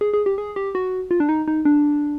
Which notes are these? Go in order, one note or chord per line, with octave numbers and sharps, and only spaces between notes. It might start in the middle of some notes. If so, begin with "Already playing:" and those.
G#4
G#4
G4
G#4
G4
F#4
F4
D4
D#4
D#4
D4